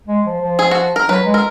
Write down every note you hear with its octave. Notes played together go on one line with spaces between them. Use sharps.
G#3
F3
F3
G#4
F#4
A#4
F#3 B4
G#3
A#4